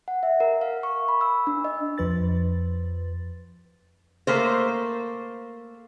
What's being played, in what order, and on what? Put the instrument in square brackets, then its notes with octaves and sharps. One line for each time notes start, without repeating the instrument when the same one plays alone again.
[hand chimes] F#5
E5
A#4
F5
C#6
B5
E6
D4
D#5
[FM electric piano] F2 F3 B4 A6
[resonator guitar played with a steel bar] A3 A#3 C5